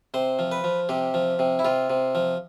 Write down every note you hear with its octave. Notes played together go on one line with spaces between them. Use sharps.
C3 C5
F3
B4
F3
C3 G4
F3
C3
E4
C3 F4
C3
F3